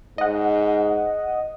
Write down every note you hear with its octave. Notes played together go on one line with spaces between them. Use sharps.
G#2 D#5 F#5